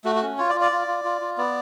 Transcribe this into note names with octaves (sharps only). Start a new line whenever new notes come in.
A3 F#4
F#4
C#4
F4 C#5
D5
F4
D5
F4
F4
F4
F4
B3 D5